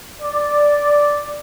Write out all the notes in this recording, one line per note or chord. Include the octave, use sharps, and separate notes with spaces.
D5